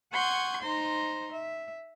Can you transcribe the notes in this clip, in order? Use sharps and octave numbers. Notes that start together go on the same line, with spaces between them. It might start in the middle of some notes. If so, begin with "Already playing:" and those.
F#5 C6 C#6 D#6 G6 G#6
D#4 C5 A#5 C6
E5